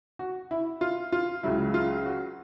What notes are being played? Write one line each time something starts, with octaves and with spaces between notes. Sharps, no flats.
F#4
E4
F4
F4
C#2 C#3 F#3 E4
F4
F#4